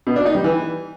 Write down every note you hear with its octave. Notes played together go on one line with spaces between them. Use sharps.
B2
D4
D#4
G3
E3